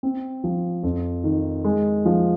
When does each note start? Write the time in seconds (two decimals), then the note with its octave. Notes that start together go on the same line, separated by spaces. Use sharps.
0.03 C4
0.44 F3
0.83 F2
1.24 D#3
1.64 G#3
2.05 F3